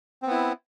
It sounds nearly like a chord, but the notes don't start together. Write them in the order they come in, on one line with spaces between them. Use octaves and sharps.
C4 B3 E4